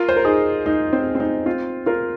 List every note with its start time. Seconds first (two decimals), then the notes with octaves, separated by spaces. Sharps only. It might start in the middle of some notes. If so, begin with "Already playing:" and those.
Already playing: F4 A#4
0.09 C5
0.16 A#4
0.25 D#4 G#4
0.66 D#4
0.93 C4
1.15 C4
1.20 D#4
1.46 C4 F4
1.86 F4 A#4